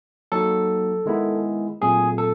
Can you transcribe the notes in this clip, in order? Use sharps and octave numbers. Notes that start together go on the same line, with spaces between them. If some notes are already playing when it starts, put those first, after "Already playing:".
F#3 A#3 D#4 A4
D#3 G#3 B3 E4
A#2 F#3 A3 C4 G#4
A4